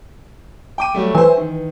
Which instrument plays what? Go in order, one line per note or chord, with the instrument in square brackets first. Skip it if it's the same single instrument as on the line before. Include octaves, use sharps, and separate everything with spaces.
[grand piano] G5 D6 D#7
F#3 G3 A3
[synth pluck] E3 [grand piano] C5 G#5
[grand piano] D#3